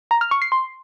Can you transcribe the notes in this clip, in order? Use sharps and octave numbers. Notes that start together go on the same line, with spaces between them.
A#5
F6
C#6
C7
C6